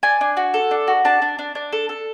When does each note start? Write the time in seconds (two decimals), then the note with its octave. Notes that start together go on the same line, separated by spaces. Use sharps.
0.03 D4 G#5
0.21 D4
0.37 F#4
0.54 A4
0.71 D4
0.88 F#4
1.05 D4 A5
1.22 D4
1.39 D4
1.55 D4
1.72 A4
1.89 A4